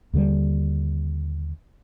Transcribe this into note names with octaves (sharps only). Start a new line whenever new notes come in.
D#2 D3 D#3 G3